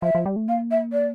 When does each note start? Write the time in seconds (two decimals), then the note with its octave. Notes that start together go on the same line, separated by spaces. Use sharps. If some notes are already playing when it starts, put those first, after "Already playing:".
0.02 F3 E5
0.15 F3
0.26 G3
0.36 A3
0.48 A#3 F5
0.71 E5
0.93 D5